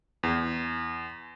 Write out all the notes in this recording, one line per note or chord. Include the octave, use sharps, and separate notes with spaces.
E2